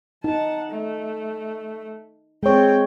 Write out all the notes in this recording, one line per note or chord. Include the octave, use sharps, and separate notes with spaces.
D#4 F#5 A5
A3
G#3 C4 C#5 G5